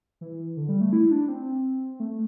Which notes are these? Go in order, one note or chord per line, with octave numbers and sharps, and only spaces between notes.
E3
D3
G3
A3
E4
D4
C4
A3